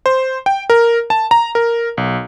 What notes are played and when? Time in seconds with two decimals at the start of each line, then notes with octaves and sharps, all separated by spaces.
0.06 C5
0.46 G5
0.70 A#4
1.10 A5
1.31 A#5
1.55 A#4
1.97 B1